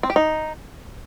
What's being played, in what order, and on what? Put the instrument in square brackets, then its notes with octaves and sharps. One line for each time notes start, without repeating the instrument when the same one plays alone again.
[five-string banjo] C4
G4
D#4